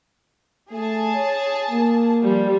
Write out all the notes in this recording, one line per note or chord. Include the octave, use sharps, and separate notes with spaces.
A3 G#4 A5
C#5
A#3
F3 G3